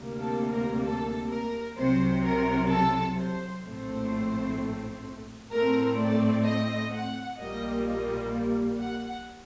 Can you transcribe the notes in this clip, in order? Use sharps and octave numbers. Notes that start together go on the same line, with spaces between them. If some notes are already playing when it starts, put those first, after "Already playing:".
Already playing: D2 C3 G3 A#3
A4
A#4
A4
A#4
C2 C3 F#3 C5
A#4
A4
C5
A#1 A2 A3 C4 C5
A2 A3 C4 A#4
D5
D#5
F#5
A#1 A#2 G3 A#3 D#5
D#5
F#5